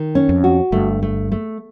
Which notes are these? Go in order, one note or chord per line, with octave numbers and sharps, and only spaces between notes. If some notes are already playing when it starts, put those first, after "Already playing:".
Already playing: D#3
C#4
F2
F#4
G1 G2 A3
A3
A3